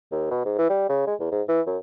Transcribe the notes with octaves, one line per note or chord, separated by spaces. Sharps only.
D#2
B2
G#2
E3
G3
C#3
G#3
E2
G#2
E3
F#2